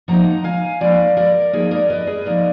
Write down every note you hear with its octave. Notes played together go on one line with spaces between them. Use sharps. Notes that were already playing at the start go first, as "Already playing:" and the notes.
F3 A#3 D#4 F#5 A#5
F5 G#5
F3 A#3 D#4 D5 F5
A#4 D5
F3 A#3 D#4 G#4 B4
A#4 D5
B4 D#5
G#4 B4
F3 A#3 D#4 A#4 D5